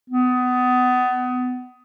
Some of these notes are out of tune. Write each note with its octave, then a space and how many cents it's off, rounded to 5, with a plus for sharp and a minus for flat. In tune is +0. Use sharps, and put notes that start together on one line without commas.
B3 +25